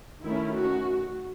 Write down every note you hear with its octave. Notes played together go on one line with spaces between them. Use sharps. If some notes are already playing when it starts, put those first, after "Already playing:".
D#3 A3 C#4 E4
F#4